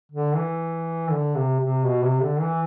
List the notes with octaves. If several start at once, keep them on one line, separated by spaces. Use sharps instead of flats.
D3
E3
D3
C3
C3
B2
C3
D3
E3